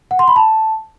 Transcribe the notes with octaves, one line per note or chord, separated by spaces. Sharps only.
F#5
C6
B5
A5